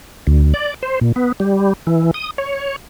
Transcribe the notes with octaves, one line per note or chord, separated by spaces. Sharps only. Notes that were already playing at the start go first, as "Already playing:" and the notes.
D2
D5
C5
A#2
B3
G3
E3
D#6
C#5